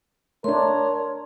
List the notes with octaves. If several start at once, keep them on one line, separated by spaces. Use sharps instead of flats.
A3 D4 A#4 C#5 C6